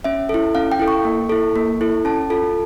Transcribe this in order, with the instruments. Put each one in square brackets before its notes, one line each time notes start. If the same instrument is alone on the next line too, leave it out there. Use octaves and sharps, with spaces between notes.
[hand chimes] C#4 E5
E4 A4
C#4 F5
G5
E4 A4
C#6
A#3
E4 A4
A#3
E4 A4
C#4 A5
F4 A4